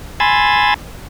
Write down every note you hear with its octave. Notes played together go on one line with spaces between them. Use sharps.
G#5 B5 C6 E6 G#6 A6